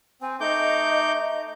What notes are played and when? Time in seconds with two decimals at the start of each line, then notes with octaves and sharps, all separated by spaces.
0.22 C4 G#5
0.40 A3 D#4 D#5 D6 G6